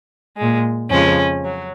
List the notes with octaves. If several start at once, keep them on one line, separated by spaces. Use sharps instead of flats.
A#2 G#3
F2 C#3 F3 G#3 C#4
F#3